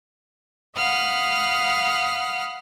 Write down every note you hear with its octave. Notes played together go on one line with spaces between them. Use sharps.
F5 F#5 B5 D#6 F6 F#6